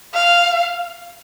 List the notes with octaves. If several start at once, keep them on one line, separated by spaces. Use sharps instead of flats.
F5